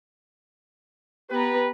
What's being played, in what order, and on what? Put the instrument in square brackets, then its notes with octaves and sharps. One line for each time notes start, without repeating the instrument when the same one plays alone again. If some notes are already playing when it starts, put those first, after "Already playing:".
[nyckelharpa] B3 A#5 [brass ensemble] G4 B4